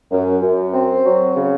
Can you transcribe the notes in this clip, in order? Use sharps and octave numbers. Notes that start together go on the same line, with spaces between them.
F#2
F#2
C4
F#3
C#3